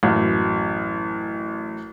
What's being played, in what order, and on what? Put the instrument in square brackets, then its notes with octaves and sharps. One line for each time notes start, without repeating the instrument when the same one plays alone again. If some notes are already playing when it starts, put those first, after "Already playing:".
[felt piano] A1 F#2